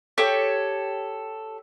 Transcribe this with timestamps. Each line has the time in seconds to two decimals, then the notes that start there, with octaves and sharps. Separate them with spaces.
0.18 G4 A4 C#5